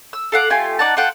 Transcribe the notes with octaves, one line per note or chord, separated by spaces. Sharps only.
E6
A4 F5 F#5 D6
A3 F4 G4 G#5
D#4 D5 F#5 A5
F4 A4 F#5 G5